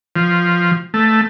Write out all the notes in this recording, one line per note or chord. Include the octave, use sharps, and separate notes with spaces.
F3
A3